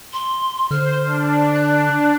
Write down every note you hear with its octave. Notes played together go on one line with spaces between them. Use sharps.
C6
D3 C5 F6
D4
F#6